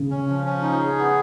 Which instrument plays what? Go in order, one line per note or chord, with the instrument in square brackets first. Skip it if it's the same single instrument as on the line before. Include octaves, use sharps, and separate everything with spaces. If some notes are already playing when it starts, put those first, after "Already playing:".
Already playing: [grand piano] C#3
[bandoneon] C#4
F3
C#4
D#4
G#4
B3